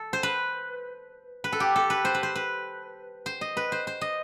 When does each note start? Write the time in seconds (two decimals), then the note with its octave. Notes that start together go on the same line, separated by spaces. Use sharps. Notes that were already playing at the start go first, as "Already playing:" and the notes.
Already playing: A4
0.13 C5
0.23 B4
1.44 B4
1.52 A4
1.60 G4
1.76 A4
1.90 B4
2.05 C5
2.14 B4
2.23 C5
2.35 B4
3.26 C5
3.41 D#5
3.57 B4
3.72 C5
3.87 C5
4.01 D#5